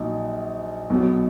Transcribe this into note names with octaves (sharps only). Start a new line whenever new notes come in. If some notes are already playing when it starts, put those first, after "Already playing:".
Already playing: A#1 A#2 F#3 D#4
B1 B2 F#3